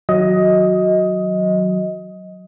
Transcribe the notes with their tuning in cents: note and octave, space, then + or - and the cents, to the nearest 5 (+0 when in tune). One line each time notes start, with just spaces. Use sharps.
D#3 +30 F#3 +0 D#5 +15